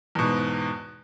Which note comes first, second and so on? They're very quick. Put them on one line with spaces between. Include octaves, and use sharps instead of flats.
E2 B2 G#2